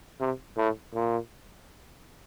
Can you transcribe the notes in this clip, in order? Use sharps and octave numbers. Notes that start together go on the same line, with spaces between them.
C3
A2
A#2